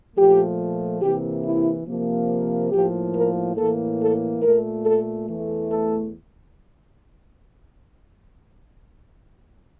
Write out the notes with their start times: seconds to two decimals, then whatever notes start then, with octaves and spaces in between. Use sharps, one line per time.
0.16 A#2 F3 A3 G4
1.01 C3 E3 A#3 G4
1.44 E4
1.87 C3 F3 A#3
2.72 A2 F3 A#3 G4
3.14 A#4
3.57 A2 E3 A#3 A4
3.99 A4
4.42 A#2 A3 A#4
4.85 A4
5.28 E2 E3 A3
5.70 A4